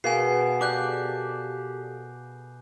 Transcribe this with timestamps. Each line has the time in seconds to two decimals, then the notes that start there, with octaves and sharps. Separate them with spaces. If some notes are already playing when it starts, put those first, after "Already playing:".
0.04 B2 G#4 A#4 F5 G#5 C7
0.61 G4 A4 D5 D6 F#6 G6